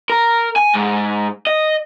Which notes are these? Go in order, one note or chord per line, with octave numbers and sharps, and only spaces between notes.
A#4
G#5
G#2
D#5